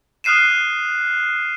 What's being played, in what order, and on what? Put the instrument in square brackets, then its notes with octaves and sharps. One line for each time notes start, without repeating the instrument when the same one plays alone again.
[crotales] D#6 F6 F#6 C7 D#7 E7